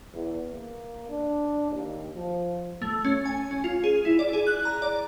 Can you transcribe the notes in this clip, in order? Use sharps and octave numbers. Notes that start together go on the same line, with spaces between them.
E2
A#3
D4
D#2
F3
A3
C#4
G#5
C#4
F4
G#4
E4
D5
G#4
F#6
A#5
D5